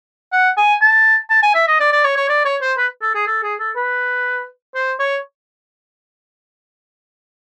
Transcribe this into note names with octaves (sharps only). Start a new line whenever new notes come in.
F#5
G#5
A5
A5
G#5
E5
D#5
D5
D5
C#5
C#5
D5
C#5
C5
B4
A4
G#4
A4
G#4
A4
B4
C5
C#5